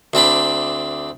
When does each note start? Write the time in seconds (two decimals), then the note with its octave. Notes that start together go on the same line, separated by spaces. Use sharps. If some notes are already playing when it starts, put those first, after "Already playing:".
0.14 D2 C4 D4 B5